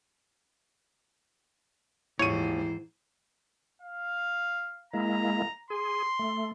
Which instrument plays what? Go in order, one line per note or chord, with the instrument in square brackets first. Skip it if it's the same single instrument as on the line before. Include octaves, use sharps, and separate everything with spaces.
[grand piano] D#1 D#7 [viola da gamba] G#2 E3 C5 [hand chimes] E4 [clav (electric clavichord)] C#5
[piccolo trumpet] F5
[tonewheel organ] G#3 A#3 E4 [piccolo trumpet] A#5
[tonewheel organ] G#4 [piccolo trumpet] C6
[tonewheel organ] A3